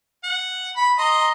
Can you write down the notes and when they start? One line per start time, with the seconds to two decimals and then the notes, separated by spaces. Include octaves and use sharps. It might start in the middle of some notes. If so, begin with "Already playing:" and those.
0.24 F#5
0.76 B5
0.98 D#5 A#5 C6